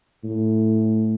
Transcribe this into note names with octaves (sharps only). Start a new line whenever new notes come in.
A2